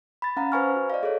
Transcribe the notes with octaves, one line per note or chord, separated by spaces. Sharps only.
B5 A6
C#4 F5 F#5 A#5
B4 C5 F5 G#5 C#6 F6
F#4
D5 D#5 F5
G#4 A4 C#5